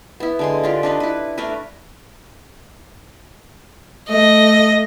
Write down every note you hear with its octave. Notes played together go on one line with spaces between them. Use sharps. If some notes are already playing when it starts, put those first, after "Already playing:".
B3 E4
D3 G#3 C6
D4 F4 G4
D4 D#4 B4
E4 B4
A3 D4 A#4 B4
A3 D#5